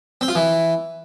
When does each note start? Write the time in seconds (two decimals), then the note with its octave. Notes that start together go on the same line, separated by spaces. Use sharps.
0.21 C4
0.28 F4
0.35 E3